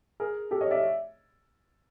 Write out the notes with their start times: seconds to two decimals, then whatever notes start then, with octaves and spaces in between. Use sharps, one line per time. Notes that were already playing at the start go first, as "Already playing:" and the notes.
0.20 G#4 A#4
0.51 G4 A4
0.61 C#5 D#5
0.71 D5 E5